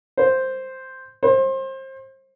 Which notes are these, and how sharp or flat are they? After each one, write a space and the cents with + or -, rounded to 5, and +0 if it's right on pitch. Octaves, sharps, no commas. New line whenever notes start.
C5 +0
C5 +30